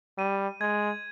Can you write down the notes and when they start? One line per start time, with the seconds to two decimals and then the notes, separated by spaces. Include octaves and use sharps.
0.17 G3 D#7
0.60 G#3 G#6